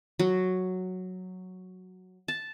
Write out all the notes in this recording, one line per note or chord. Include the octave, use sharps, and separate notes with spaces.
F#3
A5